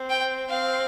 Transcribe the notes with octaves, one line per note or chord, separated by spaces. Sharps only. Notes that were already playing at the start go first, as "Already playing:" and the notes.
Already playing: C4
G5
C4 F5